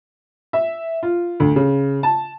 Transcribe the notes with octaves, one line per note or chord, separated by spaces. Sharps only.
E5
F4
D2
C#3
A5